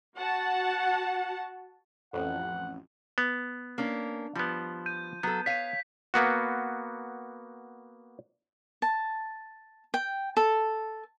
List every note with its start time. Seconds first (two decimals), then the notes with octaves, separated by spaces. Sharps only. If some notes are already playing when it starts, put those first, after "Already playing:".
0.16 F#4 F#5 A5
2.13 A1 F2 F#5
3.18 B3
3.78 A#3 C#4 D4
4.36 F3 G3 B3
4.86 G6 D#7
5.23 F#3 B3 A4
5.46 C#5 F5 B6 D#7
6.14 A#3 B3 F#4
8.82 A5
9.94 G5
10.37 A4